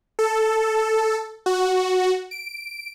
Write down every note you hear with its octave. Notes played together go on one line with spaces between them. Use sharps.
A4
F#4
D7